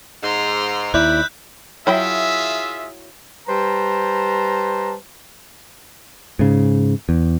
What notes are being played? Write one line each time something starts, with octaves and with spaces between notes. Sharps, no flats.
G#2 A#5 C6
D#2 E4 D5 E5 B5 F#6 G6
F#3 E4 F4 G#4 E5 G5
G3 B4 C5 A5 A#5
G#2 C#3
E2